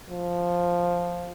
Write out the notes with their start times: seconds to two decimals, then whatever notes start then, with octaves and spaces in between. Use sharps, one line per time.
0.10 F3